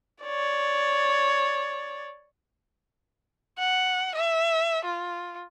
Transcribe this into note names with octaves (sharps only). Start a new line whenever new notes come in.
C#5 D5
F#5
E5
F4